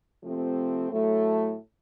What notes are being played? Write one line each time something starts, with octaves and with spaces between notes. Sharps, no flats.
C3 F3 A3 C4
A2 F#3 A3